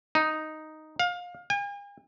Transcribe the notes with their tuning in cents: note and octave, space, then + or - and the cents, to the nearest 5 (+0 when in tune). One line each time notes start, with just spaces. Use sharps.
D#4 +0
F5 +25
G#5 -45